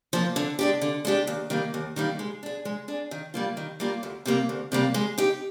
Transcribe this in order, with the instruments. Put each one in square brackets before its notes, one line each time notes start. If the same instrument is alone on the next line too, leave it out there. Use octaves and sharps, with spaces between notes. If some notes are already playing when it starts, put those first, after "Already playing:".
[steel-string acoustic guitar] F3 A#3
D3
G#3 D4 G4
D3
G#3 D4 G4
D#2
D#3 G3 A#3 D#4
D#2
D#3 G3 A#3 D#4
G#3
D4 G#4
G#3
D4 G#4
D#3
G3 A#3 F4
D#3
G3 A#3 F4
D2
C3 G3 A#3
D2
C3 G3 A#3
G#3
D#4 G4